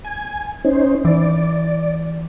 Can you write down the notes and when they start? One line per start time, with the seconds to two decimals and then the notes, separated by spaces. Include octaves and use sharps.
0.05 G#5
0.65 C#4 D#4 C5
1.05 E3 D5